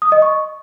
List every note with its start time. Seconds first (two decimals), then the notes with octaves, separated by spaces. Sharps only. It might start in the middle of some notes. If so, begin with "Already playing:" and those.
0.02 D#6
0.12 D#5
0.22 C#6